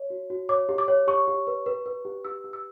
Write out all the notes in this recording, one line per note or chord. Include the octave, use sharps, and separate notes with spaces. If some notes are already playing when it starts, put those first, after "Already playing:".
Already playing: C#5
F#4
F#4
C#5 D6
G4
D6
C#5
G4 C#6
G4
B4
B4
B4
G4
G4 E6
G4
E6